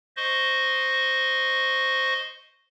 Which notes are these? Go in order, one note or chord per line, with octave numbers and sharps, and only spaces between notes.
C5 D#5 C#6